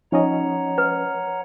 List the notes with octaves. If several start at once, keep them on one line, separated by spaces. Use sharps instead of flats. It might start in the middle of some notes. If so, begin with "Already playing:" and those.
F3 C#4 D#4 C#5 D#5 F#5 A#5
B4